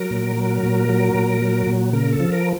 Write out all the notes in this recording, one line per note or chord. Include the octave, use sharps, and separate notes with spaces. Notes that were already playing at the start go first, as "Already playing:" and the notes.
Already playing: F#3 A#4
A#2
F#3
A#2
F#3
A#2
F#3
A#2
C#3 A#4
A4
F3
A#4